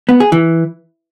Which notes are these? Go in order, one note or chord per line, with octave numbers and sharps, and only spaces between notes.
B3
G#4
E3